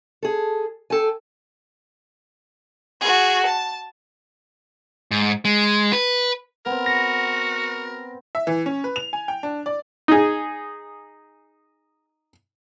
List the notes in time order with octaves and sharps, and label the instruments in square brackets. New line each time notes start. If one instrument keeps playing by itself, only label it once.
[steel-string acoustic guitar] G#4 A4
A4 G5 G#5
[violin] F#4 G#4
A5
[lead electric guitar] G#2
G#3
B4
[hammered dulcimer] B3 C4 [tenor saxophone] A#4
[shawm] F#4 [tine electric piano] A#6
[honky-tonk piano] E5
E3
C#4
B4
F7
G#5
G5
D4
D5
[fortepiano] D#4 G#4